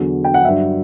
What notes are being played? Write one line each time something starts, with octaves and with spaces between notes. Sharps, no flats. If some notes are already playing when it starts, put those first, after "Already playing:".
Already playing: E2 D3 F#3
G5
F#5
G2 F#3 E5